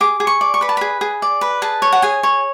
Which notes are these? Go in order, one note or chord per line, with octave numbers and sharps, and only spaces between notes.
G#4 D6
G#4
C#6
D5
C#6
B4 B5
A5
G#4 B5
G#4
D5
B4
G#4 A5
C#5
F#5
G#4 G#5
C#5